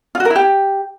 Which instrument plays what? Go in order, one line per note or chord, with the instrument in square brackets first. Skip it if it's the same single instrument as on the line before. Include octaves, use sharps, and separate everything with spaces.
[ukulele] F4
F#4
A#4
E4
G4